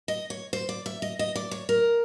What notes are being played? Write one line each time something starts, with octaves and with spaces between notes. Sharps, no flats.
D#5
C#5
C5
D5
E5
D#5
D#5
D5
C#5
A#4